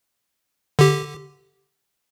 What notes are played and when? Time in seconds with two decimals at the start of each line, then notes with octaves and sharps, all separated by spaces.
0.79 D3 G4